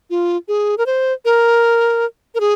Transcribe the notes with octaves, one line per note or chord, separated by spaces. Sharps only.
F4
G#4
A#4
C5
A#4
A#4
G#4